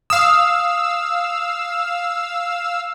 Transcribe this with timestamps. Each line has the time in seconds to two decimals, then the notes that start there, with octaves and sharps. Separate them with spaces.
0.10 F5 D#6 E6